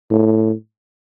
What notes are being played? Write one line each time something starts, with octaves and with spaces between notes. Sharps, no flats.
A2